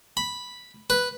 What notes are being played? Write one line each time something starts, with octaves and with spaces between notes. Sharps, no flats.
B5
B4